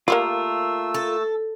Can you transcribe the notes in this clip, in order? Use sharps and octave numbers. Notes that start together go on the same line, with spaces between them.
A3 A#3 F4 G4 A#4 D5 E6
A4